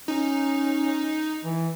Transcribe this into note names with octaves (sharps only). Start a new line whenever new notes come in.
C#4 D#4
E3